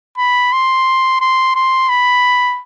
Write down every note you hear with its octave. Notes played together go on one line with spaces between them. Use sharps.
B5
C6
C6
C6
B5